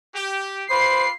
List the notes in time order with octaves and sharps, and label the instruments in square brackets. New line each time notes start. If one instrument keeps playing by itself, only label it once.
[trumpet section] G4
[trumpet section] F4 B4 D6 [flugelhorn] C5 [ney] B5 [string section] C7